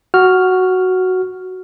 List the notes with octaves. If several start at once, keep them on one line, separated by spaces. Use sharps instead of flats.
F#4 F6